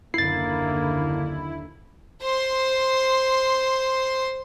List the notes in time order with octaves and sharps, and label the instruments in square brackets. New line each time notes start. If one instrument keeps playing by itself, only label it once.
[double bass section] F#1 D#2 D3 [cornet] A#3 [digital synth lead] E4 [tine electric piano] A6 C7
[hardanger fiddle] C5 C6